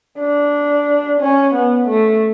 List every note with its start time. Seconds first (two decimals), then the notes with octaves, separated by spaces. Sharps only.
0.18 D4
1.20 C#4
1.54 B3
1.88 A3